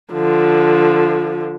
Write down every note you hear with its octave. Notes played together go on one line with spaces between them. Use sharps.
D3 F3